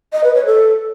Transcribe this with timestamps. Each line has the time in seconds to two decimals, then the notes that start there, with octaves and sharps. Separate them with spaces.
0.13 D#5
0.24 B4
0.35 C#5
0.46 A4